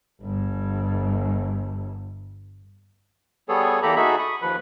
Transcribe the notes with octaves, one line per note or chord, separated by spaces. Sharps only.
G1 G2
G3 B3 G#4 A4 C#5
E2 A#3 G4 A4 A#5 B5
D#4 F#4 G#4 A4 E5 B5
B5 C#6 D#6
D#2 F3 B4 B5